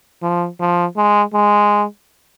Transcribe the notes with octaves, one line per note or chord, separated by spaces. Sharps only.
F3
F3
G#3
G#3